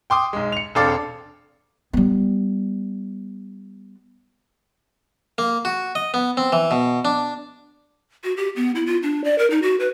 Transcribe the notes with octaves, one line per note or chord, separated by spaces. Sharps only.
G5 C6 D6 D#6
B1 G#3
C#7 F7
E1 C4 D4 A4 F5 D6
G3 B3
A#3
F#4
D#5
B3
C4
E3
B2
D4
F#4
G4
B3
E4
F4
D4
D5
A#4
D#4
F#4
B4